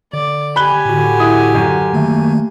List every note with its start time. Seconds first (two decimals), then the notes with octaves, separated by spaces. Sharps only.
0.13 D3 D5
0.56 G4 G#5 B5 F#6 G7
0.85 A2 D3 F#4
1.20 E4 D#6
1.55 F#2 D3
1.94 D#3 A3 A#3